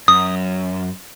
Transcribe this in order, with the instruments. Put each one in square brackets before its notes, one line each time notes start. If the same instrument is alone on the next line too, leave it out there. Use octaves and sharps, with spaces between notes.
[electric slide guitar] F#2 [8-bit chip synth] D#6